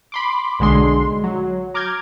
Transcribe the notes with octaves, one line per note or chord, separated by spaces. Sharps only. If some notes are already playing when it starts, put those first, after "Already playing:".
B5 C6 D6
B1 D3 G#3 C6
F#3
A#5 D6 F6 G6 G#6